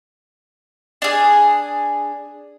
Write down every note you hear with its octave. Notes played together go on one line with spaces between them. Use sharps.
D4 G#4